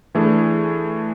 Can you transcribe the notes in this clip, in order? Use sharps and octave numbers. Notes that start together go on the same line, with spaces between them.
E3 A3 D4 G#4